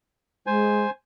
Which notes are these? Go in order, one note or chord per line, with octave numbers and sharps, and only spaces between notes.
G#3 C5 G#5